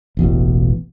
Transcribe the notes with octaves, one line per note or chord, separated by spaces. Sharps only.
E1 A1 B2